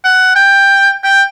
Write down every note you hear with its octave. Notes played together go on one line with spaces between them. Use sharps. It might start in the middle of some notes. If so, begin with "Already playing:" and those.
F#5
G5
G5